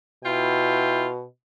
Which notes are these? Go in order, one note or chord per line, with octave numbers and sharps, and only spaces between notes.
B2 E4 F4 G5